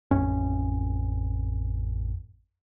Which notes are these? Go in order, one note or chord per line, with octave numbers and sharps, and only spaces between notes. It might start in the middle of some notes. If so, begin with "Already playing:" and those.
A1 F2 C#4